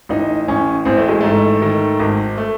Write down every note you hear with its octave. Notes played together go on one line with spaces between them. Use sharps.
A1 D#4
A1 C#4
A1 C4
A3
G#3
G#2 A3
D#3
G#1
A3